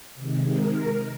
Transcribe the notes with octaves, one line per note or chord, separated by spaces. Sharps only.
C3 D#3 G#3
A#4